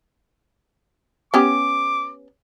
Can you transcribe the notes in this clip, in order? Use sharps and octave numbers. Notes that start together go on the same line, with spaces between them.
B3 C#4 G4 D6